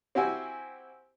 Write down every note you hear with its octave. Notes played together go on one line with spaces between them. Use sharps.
C4 E4 F#4 G4 G#5